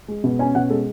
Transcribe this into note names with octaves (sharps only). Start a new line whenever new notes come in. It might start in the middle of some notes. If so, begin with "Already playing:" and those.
G#3
B2
C#4 G#5
B2 F#5
G#3 A4